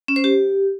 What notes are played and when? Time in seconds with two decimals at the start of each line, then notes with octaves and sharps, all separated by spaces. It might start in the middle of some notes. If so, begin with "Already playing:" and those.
0.08 C#4
0.16 C5
0.24 G4